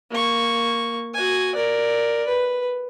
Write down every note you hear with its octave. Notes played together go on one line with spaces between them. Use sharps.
A#3 C#6
F#4 G#5
A#4 D5
B4